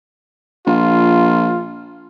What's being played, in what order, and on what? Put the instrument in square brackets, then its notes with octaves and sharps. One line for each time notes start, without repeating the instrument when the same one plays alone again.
[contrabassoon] A#1 [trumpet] F4